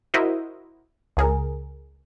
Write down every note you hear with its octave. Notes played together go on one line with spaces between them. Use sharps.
E4 F#4 A#4 C5 D#5 E5
C#2 G#4 A#4